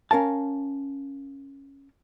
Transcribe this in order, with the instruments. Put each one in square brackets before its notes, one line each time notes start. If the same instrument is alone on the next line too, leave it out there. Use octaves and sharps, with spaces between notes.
[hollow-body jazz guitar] C#4 A#4 F5 A5